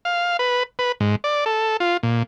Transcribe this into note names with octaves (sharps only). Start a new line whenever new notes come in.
F5
B4
B4
G#2
D5
A4
F4
A#2